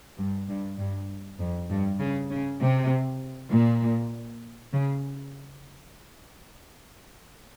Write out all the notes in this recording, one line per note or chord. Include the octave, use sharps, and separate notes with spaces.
G2
G2
G2
F2
G2
C#3
C#3
C3
A#2
C#3